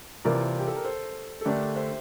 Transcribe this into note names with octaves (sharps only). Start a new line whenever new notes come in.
C2 C3 E3 A#3 F4 A#4 D5
G4
A4
A#4
A4 C5
A4
D3 A3 D4 G4 A#4
C5 E5